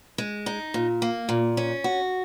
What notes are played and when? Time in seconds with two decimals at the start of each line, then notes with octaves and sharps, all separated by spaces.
0.18 G#3
0.46 D#4
0.74 A#2
1.02 A#3
1.29 A#2
1.57 C#4
1.84 F#4